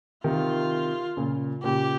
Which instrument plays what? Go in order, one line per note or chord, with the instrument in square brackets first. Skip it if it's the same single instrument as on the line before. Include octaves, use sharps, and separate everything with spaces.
[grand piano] C3 D#3 [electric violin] F4
[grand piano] A#2 C#3
[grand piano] A#2 C#3 [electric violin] G4